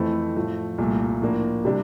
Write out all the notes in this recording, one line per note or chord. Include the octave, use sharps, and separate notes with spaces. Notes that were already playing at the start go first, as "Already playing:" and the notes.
Already playing: F2 E3 A3 C4 E4
A2 F3 A3
C2 A#2 A3
A2 F3 A#3 D4
C3 G3 D4